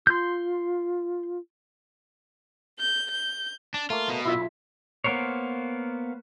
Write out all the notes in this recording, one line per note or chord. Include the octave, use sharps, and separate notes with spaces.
F4 C6 G6
G6
G6
D4
A3 A#3 F4
B2
B1 E4 F4 E5
A#3 B3 A#4 C5 C#5